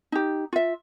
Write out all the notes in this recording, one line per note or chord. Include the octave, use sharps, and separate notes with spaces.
D#4 G4
F4 E5